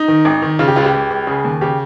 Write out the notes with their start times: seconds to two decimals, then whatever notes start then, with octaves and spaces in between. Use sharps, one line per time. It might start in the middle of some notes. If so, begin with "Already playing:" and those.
Already playing: D#4
0.08 D#3
0.25 G#1
0.42 D#3
0.59 C#3 F4
0.68 G4
0.76 C#2 F4
0.85 G4
0.93 C#2
1.10 C#2
1.27 C#3 G#4
1.44 D#2
1.61 C#3 G4